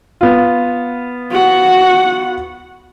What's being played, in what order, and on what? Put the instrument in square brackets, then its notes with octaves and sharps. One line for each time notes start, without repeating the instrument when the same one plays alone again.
[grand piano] B3 F4
[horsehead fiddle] F#4 F#5